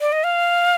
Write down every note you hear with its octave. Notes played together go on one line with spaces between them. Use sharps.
D5
D#5
F5